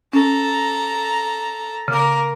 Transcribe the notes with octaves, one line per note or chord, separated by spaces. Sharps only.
C#4 A4 A#5
C#3 A#3 A#4